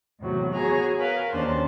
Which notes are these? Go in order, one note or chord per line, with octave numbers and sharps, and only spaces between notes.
E2 A2 C3 F#3
B3 F#4 G#4 C#5 G#5 A#5
A#4 B4 F5
D#2 C#4 D4 C5 A5